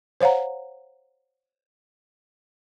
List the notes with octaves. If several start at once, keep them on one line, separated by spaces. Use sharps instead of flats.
C5 C#5 F5 F#5 A#5